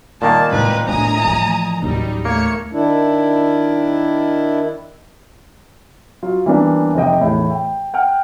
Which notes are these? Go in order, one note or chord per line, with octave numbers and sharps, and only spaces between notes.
C2 A#2 D#3 A#3 A5
A2 G#3 C4 D#4 B4
A2 B3 D4 G#5 A#5 D#6
E3 F3
A1 D#2 F#3 G3 D#4
A3 A#3 C#5 C#7
D#3 D4 E4
F#3 F4
E3 G3 A#3 B3 C#4 D4
F1 C3 D#5 G5
E2 A2
G5
F#5 G5 F6